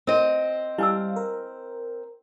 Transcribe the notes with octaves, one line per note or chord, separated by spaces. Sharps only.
C4 A#4 D#5
G3 E4 F5 G#5 E6
A#4